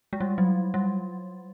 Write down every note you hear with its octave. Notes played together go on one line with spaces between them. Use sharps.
G#3
G3
F#3
G3